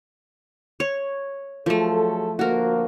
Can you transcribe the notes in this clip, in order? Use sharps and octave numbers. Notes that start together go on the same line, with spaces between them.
C#5
F3 F#3 A3 G#4 A4
D2 F3 A#3 F#4 A#4